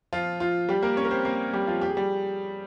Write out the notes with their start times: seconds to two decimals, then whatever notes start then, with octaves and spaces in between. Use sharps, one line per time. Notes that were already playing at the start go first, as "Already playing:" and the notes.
0.13 F3 F4
0.40 F3 F4
0.69 G3 G4
0.82 A#3 A#4
0.97 C#4 C#5
1.05 A#4
1.11 C4 C5
1.25 A#3 A#4
1.53 G3 G4
1.67 F3 F4
1.81 G4
1.89 G#4
1.97 G3 G4